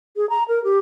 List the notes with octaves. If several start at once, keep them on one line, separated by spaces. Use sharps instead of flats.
G#4
A#5
A#4
G4